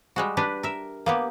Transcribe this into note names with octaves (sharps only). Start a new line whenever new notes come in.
G3 G#3 F#4
D4 G4 B4
A#4 E5
A#3 B3 G4